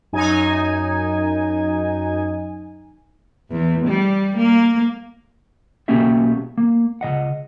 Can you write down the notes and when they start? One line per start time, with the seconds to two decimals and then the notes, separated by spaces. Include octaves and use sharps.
0.13 F#2 D#4 G#5
3.51 E2
3.87 G3
4.37 A#3
5.88 B1 A#3 C#4 F#4 G4 E5
6.58 A#3
7.01 C#2 A#2 D#5 F#5